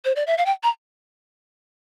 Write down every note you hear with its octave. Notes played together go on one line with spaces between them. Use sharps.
C5
D5
E5
F5
G5
A#5